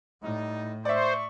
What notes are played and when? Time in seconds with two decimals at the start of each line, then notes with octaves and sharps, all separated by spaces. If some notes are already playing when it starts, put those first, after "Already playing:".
0.22 A2 G3 D#4
0.85 C5 D5 E5 C#6